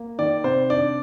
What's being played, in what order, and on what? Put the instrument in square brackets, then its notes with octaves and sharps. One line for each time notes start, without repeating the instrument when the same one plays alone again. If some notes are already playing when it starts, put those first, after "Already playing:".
Already playing: [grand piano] A#3
D#3 D5
C3 C5
D4 D5